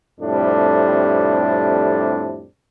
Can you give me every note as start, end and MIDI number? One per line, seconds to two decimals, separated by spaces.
0.20 2.45 41
0.20 2.45 45
0.20 2.45 48
0.20 2.45 55
0.20 2.45 62